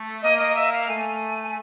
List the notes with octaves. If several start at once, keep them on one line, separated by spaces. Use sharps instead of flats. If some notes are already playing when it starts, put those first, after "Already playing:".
Already playing: A3
A#3 D#5
D#5
E5
F5
A3 G#5